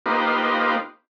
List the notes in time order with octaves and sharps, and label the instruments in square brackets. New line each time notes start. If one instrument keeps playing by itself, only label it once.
[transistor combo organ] A#3 D#4 F4 G4 B4 C5